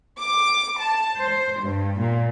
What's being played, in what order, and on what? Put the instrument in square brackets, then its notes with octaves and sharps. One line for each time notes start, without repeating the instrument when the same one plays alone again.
[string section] D6
A5
C5
G2
A#2